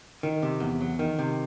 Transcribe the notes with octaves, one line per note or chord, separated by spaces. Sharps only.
D#3
C3
E2
F#3
D#3
C3